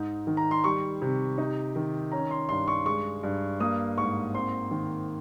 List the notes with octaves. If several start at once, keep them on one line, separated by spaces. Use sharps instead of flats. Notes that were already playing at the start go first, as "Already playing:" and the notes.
Already playing: G#2 D#4
D#3
A#5
C6
G3 C#6
C3
D#4
D#3
C#4 A#5
C6
G2 C6
C#6
G#3 C#6
G2
A#3 D#6
G#2 C#6
C4 C6
D#3